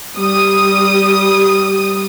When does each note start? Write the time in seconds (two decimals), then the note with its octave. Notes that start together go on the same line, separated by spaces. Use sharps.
0.17 G3 D#6